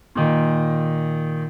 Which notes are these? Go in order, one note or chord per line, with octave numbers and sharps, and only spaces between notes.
A#2 D#3